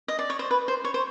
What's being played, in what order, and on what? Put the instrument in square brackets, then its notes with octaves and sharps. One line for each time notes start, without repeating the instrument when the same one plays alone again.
[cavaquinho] D#5
D5
C#5
C5
B4
C5
C#5
C5